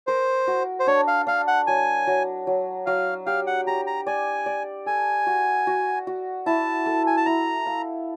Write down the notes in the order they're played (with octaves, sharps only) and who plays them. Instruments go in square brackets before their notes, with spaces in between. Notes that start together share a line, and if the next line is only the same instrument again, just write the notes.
[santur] A#4 [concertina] C5
[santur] F#4
[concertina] C5
[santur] D4 [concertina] C#5
[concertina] F5
[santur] D4 [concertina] F5
[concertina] F#5
[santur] F#3 [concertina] G#5
[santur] F#3
F#3
[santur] F#3 [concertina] F5
[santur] G4 [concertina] F5
[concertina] F#5
[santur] G4 [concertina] A#5
[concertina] A#5
[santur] D5 [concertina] G#5
[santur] D5
[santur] A4 [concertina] G#5
[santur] F#4
F#4
F#4
[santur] E4 [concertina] A5
[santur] A4
[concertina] G#5
A5
[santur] E4 [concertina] A#5
[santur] F5